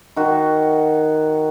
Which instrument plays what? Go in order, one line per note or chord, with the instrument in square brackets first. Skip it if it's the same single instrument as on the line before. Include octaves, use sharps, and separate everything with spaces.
[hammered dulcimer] D#3 F#4